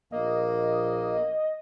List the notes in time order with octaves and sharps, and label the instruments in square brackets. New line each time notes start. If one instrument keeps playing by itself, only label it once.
[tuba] A#1 [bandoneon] A#3 [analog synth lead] D#5